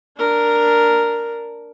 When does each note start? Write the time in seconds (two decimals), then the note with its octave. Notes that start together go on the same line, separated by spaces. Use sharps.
0.17 D4 A#4